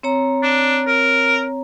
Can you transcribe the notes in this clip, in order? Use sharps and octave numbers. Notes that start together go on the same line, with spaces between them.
C4 C#5 A#5
D4
A#4